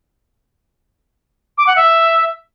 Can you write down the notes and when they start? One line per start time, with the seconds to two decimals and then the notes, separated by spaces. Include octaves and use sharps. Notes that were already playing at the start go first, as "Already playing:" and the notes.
1.58 D6
1.67 F#5
1.76 E5